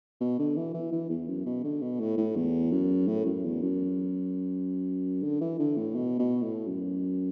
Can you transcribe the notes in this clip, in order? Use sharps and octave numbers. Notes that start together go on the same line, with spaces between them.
B2
D3
E3
E3
E3
E2
F#2
B2
D3
B2
A2
A2
E2
F#2
A2
F#2
E2
F#2
D3
E3
D3
A2
B2
B2
A2
F#2